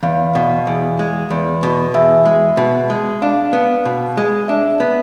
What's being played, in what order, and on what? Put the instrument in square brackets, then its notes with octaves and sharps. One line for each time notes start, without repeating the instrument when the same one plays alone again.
[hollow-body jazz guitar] E2 [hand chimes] F5
[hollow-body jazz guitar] B2
E2
G#3
E2
B2
[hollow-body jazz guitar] E2 [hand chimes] E5
[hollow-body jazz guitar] G#3
B2
G#3
[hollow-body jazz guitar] D4 [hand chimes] F5
[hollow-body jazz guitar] B3
B2
G#3
[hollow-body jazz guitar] D4 [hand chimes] E5
[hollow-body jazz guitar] B3